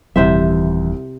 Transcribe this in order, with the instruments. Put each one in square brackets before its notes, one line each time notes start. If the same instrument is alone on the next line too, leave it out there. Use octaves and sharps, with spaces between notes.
[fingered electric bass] D#1 [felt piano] C2 [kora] C3 C5 E5 [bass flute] E3